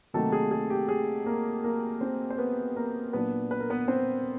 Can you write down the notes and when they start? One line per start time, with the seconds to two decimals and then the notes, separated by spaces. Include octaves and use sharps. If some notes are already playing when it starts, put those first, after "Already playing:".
0.14 C3 D#3 F#3 A3 A#3 A4
0.32 G#4
0.51 G#4
0.70 G4
0.89 G#4
1.26 A#3 A#4
1.64 A#3 A#4
2.01 C4 C5
2.30 C5
2.38 B3 B4
2.76 A#3 A#4
3.13 A#2 F#3 A#3 B3 D4 B4
3.51 B4
3.60 A#4
3.70 B3 B4
3.88 C4 C5